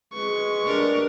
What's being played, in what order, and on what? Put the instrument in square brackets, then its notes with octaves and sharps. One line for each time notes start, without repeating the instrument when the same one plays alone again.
[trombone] G#3 [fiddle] B4 [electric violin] C#6
[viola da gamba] D4 G4 A#4